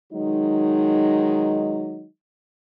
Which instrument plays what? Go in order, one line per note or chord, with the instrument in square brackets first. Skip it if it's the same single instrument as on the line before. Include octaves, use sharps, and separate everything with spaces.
[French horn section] D#3 F#3 G#3 D#4